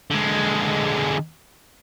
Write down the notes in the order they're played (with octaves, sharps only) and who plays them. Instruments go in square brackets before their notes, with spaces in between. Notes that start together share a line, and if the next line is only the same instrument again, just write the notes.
[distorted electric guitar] D3 G#3